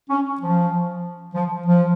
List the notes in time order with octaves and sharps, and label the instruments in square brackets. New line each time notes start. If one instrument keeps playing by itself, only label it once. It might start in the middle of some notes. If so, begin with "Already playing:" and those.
[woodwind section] C#4
F3
F3
F3